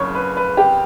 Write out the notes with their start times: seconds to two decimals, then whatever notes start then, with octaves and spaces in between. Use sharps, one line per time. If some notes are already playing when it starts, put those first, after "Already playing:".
Already playing: F#1 C#3 C#5
0.15 B4
0.37 B4
0.57 G4